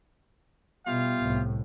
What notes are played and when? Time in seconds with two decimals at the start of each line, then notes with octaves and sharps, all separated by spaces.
0.86 B2 G3 B3 F4 G4 E5 F5
1.21 C2 A2